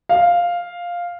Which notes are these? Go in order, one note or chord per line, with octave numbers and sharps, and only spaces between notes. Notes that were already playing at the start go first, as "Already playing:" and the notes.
F5